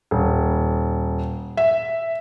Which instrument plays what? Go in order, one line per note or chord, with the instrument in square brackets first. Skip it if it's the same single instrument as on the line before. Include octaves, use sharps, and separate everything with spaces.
[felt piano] D#1
E5